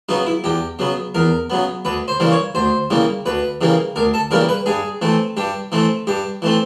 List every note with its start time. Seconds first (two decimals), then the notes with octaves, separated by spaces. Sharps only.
0.09 C#3 F#3 B3 D#4
0.26 E4
0.44 E2 G4
0.79 C#3 F#3 B3
1.15 E2 A#4
1.50 C#3 F#3 B3
1.85 D2 B4
2.08 C5
2.20 C#3 E3 G3 A#3
2.31 C#5
2.55 D2 C5
2.90 C#3 E3 G3 A#3
3.26 D2 B4
3.61 C#3 E3 G3 A#3
3.96 D2 A#4
4.14 A4
4.31 C#3 E3 G3 A#3 A#4
4.49 B4
4.66 G2 G#4
5.02 E3 A3 C4
5.37 G2 G4
5.72 E3 A3 C4
6.07 G2 G4
6.42 E3 A3 C4